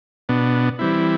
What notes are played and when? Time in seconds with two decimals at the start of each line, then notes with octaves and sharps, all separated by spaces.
0.29 B2 B3 D4
0.79 E3 G3 C4 E4